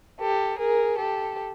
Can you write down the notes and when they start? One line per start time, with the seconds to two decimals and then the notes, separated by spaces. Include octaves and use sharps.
0.20 G4 A4
0.58 G#4 A#4
0.97 G4 A4